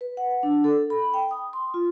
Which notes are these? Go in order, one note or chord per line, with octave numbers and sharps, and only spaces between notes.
B4
F#5
D4
A4
B5
G5
D#6
C6
F4